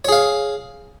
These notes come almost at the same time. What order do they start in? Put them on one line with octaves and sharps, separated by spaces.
C#5 G#4 F5